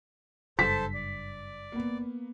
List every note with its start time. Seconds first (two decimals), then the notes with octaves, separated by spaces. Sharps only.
0.59 F#1 G2 A4 C5 A5 B6
0.94 D5
1.72 A#3 B3